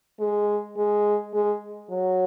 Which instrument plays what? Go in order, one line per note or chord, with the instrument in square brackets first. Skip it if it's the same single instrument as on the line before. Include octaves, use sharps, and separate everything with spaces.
[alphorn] G#3
G#3
G#3
F#3